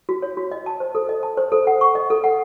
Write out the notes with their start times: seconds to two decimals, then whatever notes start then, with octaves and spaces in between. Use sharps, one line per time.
0.09 F#4
0.22 C#5
0.37 F#4
0.52 D#5
0.66 A5
0.80 C5
0.95 A4
1.09 D#5
1.23 A5
1.37 C5
1.52 A4
1.67 F#5
1.81 C#6
1.95 D#5
2.10 A4
2.24 F#5